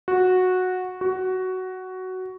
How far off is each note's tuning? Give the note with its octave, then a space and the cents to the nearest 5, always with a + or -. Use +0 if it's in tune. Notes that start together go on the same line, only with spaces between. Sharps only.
F#4 -10
F#4 +10